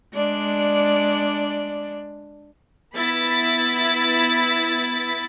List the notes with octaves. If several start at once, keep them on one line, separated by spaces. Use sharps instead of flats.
G#3 D4 D5
B3 E4 B5 A6 B6